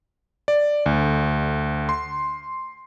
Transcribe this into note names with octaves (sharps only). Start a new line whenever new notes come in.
D5
D2
C6